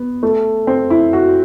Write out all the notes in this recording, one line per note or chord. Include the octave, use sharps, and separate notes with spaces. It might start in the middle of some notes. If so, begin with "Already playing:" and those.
Already playing: B3
A3
C4
E4
F#4